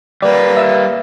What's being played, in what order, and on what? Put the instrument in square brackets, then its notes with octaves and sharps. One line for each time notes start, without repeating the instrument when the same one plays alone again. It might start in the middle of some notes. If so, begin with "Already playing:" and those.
[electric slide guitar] G3 A#3 [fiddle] B4 [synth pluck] D5
[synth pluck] E5 E6